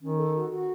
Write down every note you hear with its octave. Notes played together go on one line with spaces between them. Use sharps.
D#3 C#4
A4
F#4
F#4